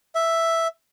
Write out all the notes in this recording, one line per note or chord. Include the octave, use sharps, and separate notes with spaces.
E5